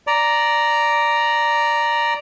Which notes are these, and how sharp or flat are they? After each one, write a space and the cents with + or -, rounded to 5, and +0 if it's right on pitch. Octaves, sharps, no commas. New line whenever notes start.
D5 -5 A#5 +0